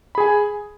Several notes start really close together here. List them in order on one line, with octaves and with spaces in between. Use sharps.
B5 G#4 G#5